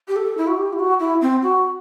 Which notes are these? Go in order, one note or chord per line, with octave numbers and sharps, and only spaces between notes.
G4
A4
E4
F#4
G4
E4
F#4
E4
C4
F#4